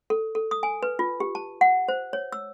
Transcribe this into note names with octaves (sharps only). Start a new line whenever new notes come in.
A4
A4
D#6
G#5
B4
F4
G4
A5
F#5
C5
C#5
E6